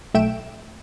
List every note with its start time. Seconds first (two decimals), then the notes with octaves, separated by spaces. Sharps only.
0.14 B1 A3 E5 G5 D7 E7